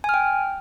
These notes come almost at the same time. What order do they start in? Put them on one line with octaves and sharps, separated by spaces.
G#5 F6 G5